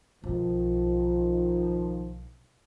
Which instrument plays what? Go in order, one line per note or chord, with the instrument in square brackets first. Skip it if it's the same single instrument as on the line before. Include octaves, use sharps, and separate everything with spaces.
[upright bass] B1 [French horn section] D#3 F3